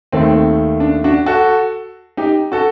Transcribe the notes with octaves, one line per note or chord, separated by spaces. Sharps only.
D#2 D#3 A3 C4
D4
D4 F#4
F#4 A4
D#4 G4
F#4 A4